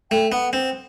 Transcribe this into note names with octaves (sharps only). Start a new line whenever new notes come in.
A3 G5
B3 F#5
C4 G5